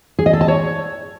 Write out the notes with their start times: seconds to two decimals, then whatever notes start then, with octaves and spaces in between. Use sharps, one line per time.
0.19 G#4
0.26 D#5
0.33 A4
0.41 A5
0.48 C#5